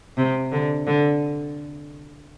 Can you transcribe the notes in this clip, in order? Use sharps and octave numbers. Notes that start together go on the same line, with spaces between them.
C3
D3
D3